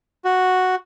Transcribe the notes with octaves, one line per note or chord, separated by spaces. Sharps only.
F#4